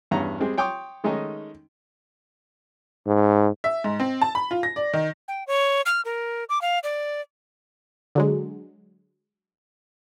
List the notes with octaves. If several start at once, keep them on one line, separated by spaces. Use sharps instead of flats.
E2 G2 C#4 F#5 A#5
G3 G#3 C4 G#4
C#5 G5 C6 D6 D#6
D#3 G#3 A3 C#4 D#4
G#2
E5
G#2
C4
A5
B5
F4
A#6
D5
D#3
G5
C#5
F6
A#4
D6
F5
D5
D3 F#3 G#3